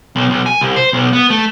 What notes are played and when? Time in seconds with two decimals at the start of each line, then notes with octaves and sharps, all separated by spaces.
0.16 B1
0.30 B1
0.46 G#5
0.61 C2
0.76 C5
0.93 B1
1.13 B3
1.30 A3